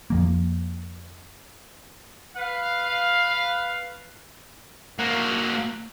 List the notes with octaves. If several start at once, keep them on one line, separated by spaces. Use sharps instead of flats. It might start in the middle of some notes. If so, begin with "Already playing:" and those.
F2 F3 A#3
B4 F5
A#3 F#4